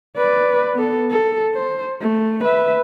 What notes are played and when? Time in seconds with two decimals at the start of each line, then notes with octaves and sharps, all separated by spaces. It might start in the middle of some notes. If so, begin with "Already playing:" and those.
0.17 B4 D5
0.74 B3 A4
1.11 A4
1.54 C5
2.01 A3
2.44 B4 E5